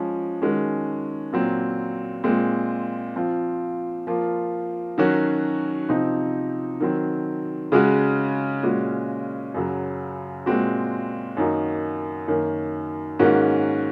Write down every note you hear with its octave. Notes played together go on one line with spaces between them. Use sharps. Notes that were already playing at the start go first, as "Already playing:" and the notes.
Already playing: F3 G#3 C#4
D#3 G#3 C#4 F#4
A#2 F#3 C4
A#2 G#3 C4
F3 C4 F4
F3 A#3 F4
D#3 F#3 C#4 F#4
C3 F3 C4 D#4
D#3 F#3 C4
C#3 G#3 C#4 F#4
A#2 G#3 C#4 F#4
F#2 C#3 F#3
A#2 G#3 C4 F#4
F#2 D#3 A#3 D#4 F#4
F#2 D#3 A#3
G#2 D#3 A#3 C#4 F#4